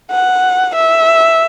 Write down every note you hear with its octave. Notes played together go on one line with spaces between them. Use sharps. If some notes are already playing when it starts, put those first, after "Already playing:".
F#5
E5